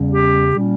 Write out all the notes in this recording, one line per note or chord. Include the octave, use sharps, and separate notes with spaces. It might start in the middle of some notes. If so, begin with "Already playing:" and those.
Already playing: E2 C#3 G3 C#4
G4
A#2 G3 A#3 C#4